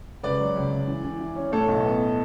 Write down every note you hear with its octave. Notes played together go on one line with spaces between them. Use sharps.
C#2 B4 D5
F#3
C#2
C#2
E3
E3
E3
C#4
A2 A4 C#5
B1
B3